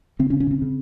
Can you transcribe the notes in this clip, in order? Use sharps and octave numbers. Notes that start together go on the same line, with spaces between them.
C#3 C4
C#4
C#3
C#4
C#3 C4
C#3